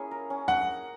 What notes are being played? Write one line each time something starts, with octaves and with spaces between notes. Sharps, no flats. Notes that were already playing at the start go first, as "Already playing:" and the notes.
Already playing: A#3 C#4 E4 G#4
A#4
C#4
C#4 F#5